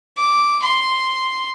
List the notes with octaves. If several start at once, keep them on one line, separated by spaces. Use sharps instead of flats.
D6
C6